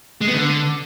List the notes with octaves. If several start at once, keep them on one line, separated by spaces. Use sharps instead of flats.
G#3
B3
D3